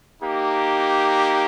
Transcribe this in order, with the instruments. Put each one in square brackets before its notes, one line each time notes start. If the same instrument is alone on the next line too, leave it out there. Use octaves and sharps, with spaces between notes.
[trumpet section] A#3 D#4 G4